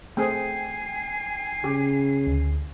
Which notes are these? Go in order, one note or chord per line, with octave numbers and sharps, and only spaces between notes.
A3 C4 G#4 G5 G#5 C7
C#3 G4
D2